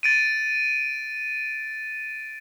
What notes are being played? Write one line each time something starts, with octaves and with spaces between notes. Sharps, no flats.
A6 D7 D#7